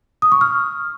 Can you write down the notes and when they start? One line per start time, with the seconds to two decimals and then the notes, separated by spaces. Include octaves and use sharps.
0.22 D#6
0.32 C#6
0.41 F6